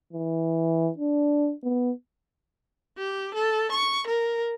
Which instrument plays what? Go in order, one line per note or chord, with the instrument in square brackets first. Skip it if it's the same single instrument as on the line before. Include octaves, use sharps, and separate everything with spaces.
[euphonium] E3
D4
B3
[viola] G4
A4
C#6
A#4